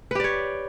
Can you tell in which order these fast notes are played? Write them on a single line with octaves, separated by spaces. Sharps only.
B4 G4 D5 C#5